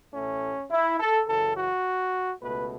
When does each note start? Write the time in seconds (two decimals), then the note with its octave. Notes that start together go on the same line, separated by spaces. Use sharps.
0.14 A1 A2 A3 C#4
0.71 E4
1.00 A4
1.28 F#2 C#3 E3 A4
1.57 F#4
2.43 C#2 B2 A3 B4